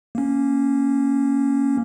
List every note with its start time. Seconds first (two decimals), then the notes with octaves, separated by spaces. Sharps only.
0.15 A#3 C#4